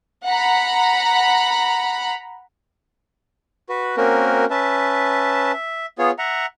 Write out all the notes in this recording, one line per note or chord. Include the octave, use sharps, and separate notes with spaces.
F#5 A#5 B5
F#4 B4
A#3 C4 C#4 F#4 A#4
C#4 B4 E5 A5
E5
B3 F4 G#4 C#5
E5 F#5 A#5